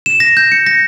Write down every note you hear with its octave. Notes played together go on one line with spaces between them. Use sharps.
E7
A#6
G6
C#7
A#6